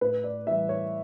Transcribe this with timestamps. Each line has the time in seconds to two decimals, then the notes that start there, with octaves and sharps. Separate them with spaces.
0.01 A2 B4
0.24 D5
0.46 E3 G3 E5
0.69 C#5